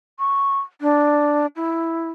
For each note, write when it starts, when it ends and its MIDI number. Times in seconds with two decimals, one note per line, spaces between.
0.19 0.60 85
0.81 1.46 62
1.56 2.09 64